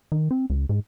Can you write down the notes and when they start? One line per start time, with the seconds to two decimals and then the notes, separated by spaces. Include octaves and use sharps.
0.12 D#3
0.31 C4
0.50 C#2
0.69 G#2